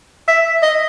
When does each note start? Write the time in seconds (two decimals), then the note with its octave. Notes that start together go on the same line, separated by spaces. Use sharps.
0.28 E5
0.63 D#5